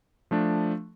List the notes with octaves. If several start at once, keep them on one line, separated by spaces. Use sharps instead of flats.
F3 A3 D4